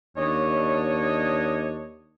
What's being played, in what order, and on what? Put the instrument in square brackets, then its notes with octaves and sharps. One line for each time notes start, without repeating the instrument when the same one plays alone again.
[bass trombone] D#2 [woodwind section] D4 C#5 D#5